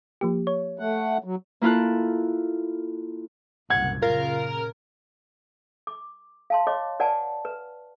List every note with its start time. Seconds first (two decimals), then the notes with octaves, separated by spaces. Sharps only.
0.21 F3 A#3 G4
0.47 C#5
0.79 A3 F#5
1.24 F#3
1.61 A#3 E4 F4 A4 F#6
3.70 F#1 C2 A#2 F#5 G#6
4.02 A#2 C#3 F4 A#4
5.87 D6
6.50 F5 A5 C6
6.67 C#5 D#5 C6 D6
7.00 B4 D5 F#5 G#5 A5
7.45 B4